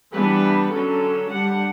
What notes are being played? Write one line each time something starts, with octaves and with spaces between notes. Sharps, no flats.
E3 G3 B3 D4 B4
D3 F#3 C#4 A4
G3 D4 F#5